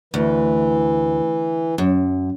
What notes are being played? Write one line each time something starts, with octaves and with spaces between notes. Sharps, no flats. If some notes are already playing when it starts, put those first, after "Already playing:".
D2 E3
F#2